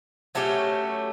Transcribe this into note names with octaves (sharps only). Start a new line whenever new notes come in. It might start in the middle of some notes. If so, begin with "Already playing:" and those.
F#3 A3 C#4 G4